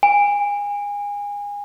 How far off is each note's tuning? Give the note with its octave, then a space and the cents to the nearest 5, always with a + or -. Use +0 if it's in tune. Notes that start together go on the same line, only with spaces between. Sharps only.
G#5 -30